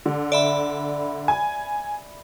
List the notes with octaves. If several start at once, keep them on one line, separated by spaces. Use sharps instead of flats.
D3
D5 E5 B5
G#5